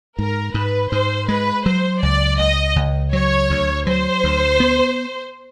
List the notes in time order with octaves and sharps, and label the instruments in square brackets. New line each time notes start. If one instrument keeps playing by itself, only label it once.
[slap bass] G#2 [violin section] A#4
[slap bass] G#2 [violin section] B4
[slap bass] G#2 [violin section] C5
[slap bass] G#3 [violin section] B4
[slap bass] F#3 [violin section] C5
[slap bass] C#2 [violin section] D5
[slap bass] C#2 [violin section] D#5
[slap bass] C#2
[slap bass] F#3 [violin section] C#5
[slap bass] D2
[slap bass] F#3 [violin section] C5
[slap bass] D2
B3